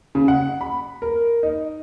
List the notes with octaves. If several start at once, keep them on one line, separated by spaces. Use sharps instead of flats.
C#3
F#5
B5
A#4
D#4